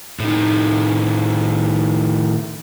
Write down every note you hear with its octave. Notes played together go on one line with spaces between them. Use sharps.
A2 D#3